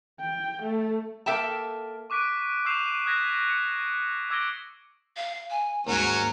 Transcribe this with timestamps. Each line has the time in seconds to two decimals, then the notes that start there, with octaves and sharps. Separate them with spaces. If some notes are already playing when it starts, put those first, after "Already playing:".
0.20 G5
0.63 A3
1.26 A#3 A4 E5 G5 A5
2.10 C#6 D6 F#6 B6 D7 D#7
2.65 C#6 E6 G6 C7 E7 F7
3.06 D#6 F#6 G#6 A#6 B6
3.50 C#7
4.30 D6 E6 G#6 A#6 D7 G7
5.17 F5
5.51 G#5
5.87 D#2 G#2 F#3 C#4 A#5